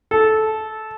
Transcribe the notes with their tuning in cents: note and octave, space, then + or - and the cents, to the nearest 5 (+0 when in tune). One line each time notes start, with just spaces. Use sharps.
A4 -15